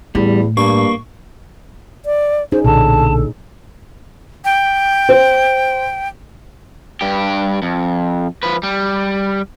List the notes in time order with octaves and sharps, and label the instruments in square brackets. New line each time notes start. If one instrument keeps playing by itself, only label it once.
[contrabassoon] E2 [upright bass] A2 [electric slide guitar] G3
[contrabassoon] G2 [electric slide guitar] A#3 [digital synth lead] C#6
[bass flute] D5
[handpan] C#4 D#4 G#4 [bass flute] C5
[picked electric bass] B1 D3 [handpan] A#2 [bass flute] A4 [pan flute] A5
[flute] G5
[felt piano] C5
[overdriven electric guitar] G2 G4
F2
F3 B4
G3